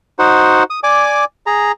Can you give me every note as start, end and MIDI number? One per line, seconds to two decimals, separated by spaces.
0.19 0.63 63
0.19 0.63 66
0.19 0.63 72
0.19 0.63 78
0.70 0.80 87
0.83 1.25 74
0.83 1.25 80
0.83 1.25 86
1.46 1.72 68
1.46 1.72 82